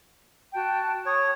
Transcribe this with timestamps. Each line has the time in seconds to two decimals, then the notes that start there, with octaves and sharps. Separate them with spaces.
0.53 F#4 G5 A5
1.06 C#5 D#6